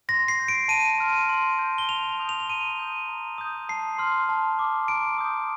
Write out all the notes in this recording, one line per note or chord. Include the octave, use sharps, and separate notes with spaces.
C6 A#6
C7
G6
D7
A5 D#7
C6 F6
C6
G6
G7
A5 F7
G7
D#6 G6
F7
F7
A#5 D#7
D#6 G6
A#5
D#6 G6
A5 C7
C6 F6
A5
D6 F6
A#5 D7
D#6 G6